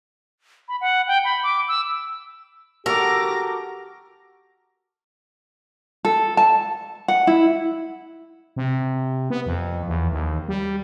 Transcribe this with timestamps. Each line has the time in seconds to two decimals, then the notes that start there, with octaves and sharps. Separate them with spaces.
0.68 B5
0.81 F#5
1.08 G5
1.24 B5
1.43 D6
1.68 E6
2.86 F#4 G4 A4 A#4 D6 A#6
6.05 A4
6.37 A5
7.08 F#5
7.27 E4
8.56 C3
9.30 B3
9.46 F2
9.88 E2
10.12 D#2
10.48 G3